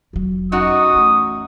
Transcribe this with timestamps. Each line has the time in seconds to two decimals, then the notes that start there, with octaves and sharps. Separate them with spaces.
0.13 F1 F#3
0.52 F#2 D#4 F#4 F#5 D#6
0.93 E3 A3